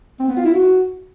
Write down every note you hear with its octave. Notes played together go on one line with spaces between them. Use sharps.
C4
B3
F4
E4
F#4